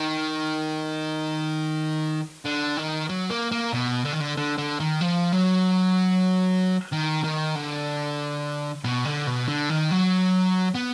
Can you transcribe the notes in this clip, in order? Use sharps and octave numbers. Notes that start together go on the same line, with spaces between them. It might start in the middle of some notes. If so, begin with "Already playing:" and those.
Already playing: D#3
D3
D#3
F#3
A#3
A#3
B2
D3
D#3
D3
D3
D3
D#3
F3
F#3
D#3
D#3
D3
B2
D3
B2
D3
D#3
F#3
B3